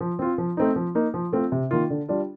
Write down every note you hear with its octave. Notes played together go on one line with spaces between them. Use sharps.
F3
C4 F4
F3
A3 C4 D#4
F3
A#3 D#4
F3
A3 C4 F4
C3
D#3 A#3 F4
D3
G3 D4 F4